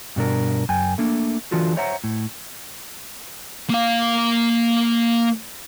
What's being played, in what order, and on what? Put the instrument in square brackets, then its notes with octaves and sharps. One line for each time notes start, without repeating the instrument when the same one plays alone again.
[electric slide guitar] G2 B2 D4 A#4
F#2 G5 G#5
A3 A#3 D4
E3 D4 F4 F#4 A4
C5 C#5 E5 F#5 A#5
A2
[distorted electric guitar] A#3 F5